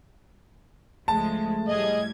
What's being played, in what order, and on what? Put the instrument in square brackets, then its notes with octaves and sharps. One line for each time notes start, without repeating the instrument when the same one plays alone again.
[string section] C#2 F3 G#3 [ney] A3 [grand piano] A5
[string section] A2 G3 G#6 [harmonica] G#4 D#5